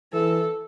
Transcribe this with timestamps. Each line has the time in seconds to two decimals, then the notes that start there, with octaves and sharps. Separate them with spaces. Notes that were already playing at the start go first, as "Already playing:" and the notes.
0.13 E3 A4